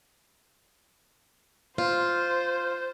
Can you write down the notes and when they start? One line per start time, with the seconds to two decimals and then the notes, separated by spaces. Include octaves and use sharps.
1.78 F4 C5